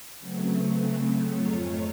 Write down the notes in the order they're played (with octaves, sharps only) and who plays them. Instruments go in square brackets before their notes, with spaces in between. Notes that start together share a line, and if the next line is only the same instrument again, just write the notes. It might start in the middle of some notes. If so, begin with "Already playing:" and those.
[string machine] C#3 F#3 A3 B3 C4
F2 G#2 A3 F4 C#5 A#5